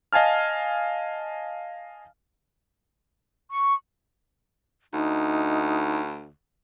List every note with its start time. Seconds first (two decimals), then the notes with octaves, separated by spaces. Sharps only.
0.13 D#5 F5 G#5 A5 F6
3.50 C#6
4.93 D2 D#4